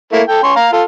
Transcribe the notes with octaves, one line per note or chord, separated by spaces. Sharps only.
A3 A#3 E4
A4 G5
C#4 C6 C#6
F5 A#5
F4 A4